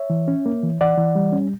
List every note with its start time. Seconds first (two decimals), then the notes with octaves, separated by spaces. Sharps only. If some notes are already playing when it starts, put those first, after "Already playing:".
Already playing: C#5 E5
0.10 E3
0.28 C#4
0.46 A#3
0.63 E3
0.81 E3 D5 F#5
0.97 E3
1.15 G3
1.33 C#4